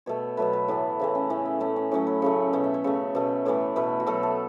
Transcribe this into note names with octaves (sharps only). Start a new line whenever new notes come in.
B2 A3 C#5
B2 F#3 A3 B4
B4
A2 E3 A3 B3
C#3 E3 A3 C#4
C#4
A2 E3 A3 C#4
B3
A2 A3 C#4
C#4
A2 F#3 A3 C#4
B4
C#3 F#3 A3 C#5
B2 A3 C#5
E5
C#5
C#3 A3 C#5
B2 A3
A2 E3 A3 C#5
B2 A3 B4
F#4
B2 F#3 A3 A4
A4